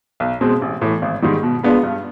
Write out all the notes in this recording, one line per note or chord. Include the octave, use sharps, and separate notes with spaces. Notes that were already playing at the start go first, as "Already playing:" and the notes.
B1
B2 G#3 C4
A1
A2 E3
G#1
G#2 D#3 G3
B2
G#3 B3 D4 F4
G2